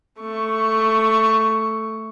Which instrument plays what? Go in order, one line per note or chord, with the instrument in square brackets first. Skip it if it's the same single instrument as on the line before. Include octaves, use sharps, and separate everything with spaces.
[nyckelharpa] A3 C#6